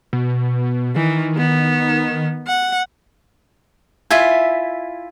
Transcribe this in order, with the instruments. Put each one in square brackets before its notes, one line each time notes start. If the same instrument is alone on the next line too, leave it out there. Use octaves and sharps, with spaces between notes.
[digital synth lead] B2
[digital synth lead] D#3 [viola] E3
[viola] B3
F#5
[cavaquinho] E4 F4 E5 G#5